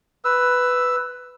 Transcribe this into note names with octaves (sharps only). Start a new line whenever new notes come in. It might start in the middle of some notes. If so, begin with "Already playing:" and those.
B4 E6